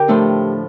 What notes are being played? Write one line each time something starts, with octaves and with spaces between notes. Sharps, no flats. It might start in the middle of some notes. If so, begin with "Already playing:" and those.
Already playing: D3 G4 A#4
A2 F3 A3 D4